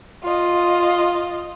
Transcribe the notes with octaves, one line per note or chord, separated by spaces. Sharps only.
F4 D#5